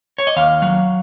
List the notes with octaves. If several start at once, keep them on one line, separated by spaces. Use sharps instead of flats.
C#5
D#5
D#2 F5
F#3